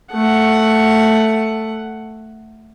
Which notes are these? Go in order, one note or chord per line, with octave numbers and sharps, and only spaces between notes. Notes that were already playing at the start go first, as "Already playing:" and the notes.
A3 F#5